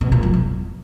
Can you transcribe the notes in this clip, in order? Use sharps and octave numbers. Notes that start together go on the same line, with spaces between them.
B2
A#2
F#2
E2